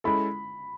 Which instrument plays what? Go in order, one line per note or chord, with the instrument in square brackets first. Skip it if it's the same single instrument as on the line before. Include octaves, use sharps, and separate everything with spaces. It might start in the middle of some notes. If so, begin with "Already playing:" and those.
[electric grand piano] G#3 C#4 E4 A4 [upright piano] B5